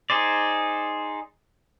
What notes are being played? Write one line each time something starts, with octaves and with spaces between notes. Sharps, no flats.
D#4 G#4 C5 D5